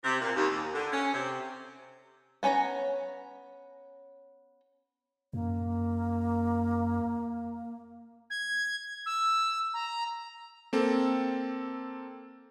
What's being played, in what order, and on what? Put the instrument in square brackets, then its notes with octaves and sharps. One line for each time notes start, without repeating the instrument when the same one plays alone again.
[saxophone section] C3
A#2
D#2
D#2
D3
C#4
C3
[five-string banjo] B3 C#4 E4 C#5 A#5
[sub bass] F#2 [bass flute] A#3
[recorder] G#6
E6
A#5
[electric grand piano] A#3 C4 A4